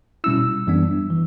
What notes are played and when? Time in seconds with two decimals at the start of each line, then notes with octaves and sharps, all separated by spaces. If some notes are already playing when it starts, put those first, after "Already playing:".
0.24 B2 G3 C#4 E4 E6
0.67 F#2 E3 G3 B3 D4
1.10 E3